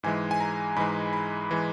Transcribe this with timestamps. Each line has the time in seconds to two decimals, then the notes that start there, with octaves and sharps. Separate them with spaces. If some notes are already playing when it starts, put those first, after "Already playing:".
0.03 G#2 E3 G#3 G#5
0.31 G#5
0.40 A#5
0.76 G#2 E3 G#3 B5
1.13 B5
1.51 E3 G#3